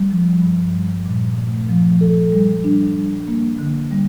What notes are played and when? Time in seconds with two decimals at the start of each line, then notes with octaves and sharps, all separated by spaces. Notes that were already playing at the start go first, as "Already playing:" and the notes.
Already playing: G3
0.11 F3
0.42 G2
0.73 G3
1.06 A#2
1.37 A3
1.69 F3
2.01 A4
2.32 G3
2.64 D4
2.96 G3
3.27 A#3
3.59 D3
3.91 G3